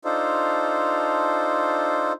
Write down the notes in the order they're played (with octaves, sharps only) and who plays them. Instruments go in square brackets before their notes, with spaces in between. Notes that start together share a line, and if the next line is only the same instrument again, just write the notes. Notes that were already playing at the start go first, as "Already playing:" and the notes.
[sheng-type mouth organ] D4 D#4 F4 A4 C5